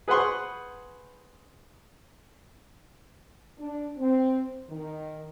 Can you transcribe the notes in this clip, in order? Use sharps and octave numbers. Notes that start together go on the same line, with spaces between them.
G#4 B4 C5 F#5 C6 C#6
D4
C4
D#3